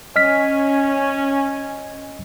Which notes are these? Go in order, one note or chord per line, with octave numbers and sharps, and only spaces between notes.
C#4 D#5 G#5 F6 B6